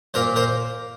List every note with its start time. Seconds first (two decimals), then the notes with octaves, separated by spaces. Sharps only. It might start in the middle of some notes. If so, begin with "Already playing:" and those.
0.14 A#2 A#4 C5
0.36 A#4 C5